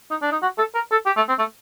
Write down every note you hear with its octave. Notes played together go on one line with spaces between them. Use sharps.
D#4
D4
D#4
F#4
A4
A#4
A4
G4
A3
C4
A3